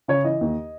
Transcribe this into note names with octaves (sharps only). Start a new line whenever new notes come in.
C#3 C#5
E3 D#5
D#2